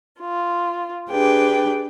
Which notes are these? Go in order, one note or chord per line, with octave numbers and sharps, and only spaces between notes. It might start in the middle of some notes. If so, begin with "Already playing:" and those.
F4
D4 G4 G#4 B4 G5